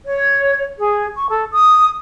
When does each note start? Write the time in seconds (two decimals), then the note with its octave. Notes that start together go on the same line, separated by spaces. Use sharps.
0.05 C#5
0.77 G#4
1.14 C#6
1.28 A4
1.51 D#6